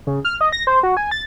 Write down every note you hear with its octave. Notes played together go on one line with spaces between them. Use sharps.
C#3
F6
D#5
A#6
C5
F#4
G#5
A6